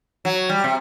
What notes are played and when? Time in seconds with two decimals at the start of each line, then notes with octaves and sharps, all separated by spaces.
0.25 F#3
0.49 G3
0.64 C3